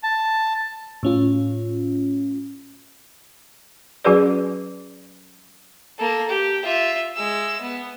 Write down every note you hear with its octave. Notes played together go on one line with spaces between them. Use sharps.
A5
A2 C#4 F4
F#3 C#4 F#4 G#4 B4 D5
A#3 A4
G4
F4 E5
G#3 E6
B3